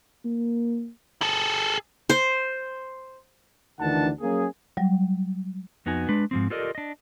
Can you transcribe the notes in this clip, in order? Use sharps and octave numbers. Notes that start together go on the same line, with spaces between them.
A#3
G#4 A4
C5
D2 D#3 E3 D4 F#5 A5
F#3 A#3 C#4 G#4
F#3 G3
F2 B3 D#4 F#4 G#5
G#3 D4 B4
G#2 F3 C4
F4 G4 A4 A#4 D5 D#5
D4 D#5